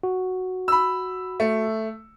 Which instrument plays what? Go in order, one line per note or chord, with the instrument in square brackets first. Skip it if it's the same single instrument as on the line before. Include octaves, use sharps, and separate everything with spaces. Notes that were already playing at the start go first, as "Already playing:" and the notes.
[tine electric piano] F#4
[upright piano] B5 E6
A3